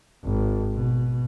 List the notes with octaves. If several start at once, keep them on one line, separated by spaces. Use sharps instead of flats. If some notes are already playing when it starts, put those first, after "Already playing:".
G#1
B2